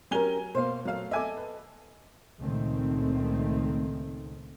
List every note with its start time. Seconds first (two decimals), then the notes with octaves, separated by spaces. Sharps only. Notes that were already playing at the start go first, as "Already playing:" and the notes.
0.11 F#3 C#4 G4 A#4 G#5 G7
0.55 B2 A#3 C5 F5
0.85 A#2 F#3 A3 F5
1.11 A4 D#5 E5 G#5 D6
1.37 B4
2.40 C#2 A#2 D#3 A3 C4